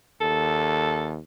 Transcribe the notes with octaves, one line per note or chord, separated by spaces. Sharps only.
D#2 A4